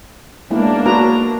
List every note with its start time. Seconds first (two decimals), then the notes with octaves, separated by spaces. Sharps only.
0.51 G#3 A#3 B3 D4 E4
0.86 F#4 B4 A#5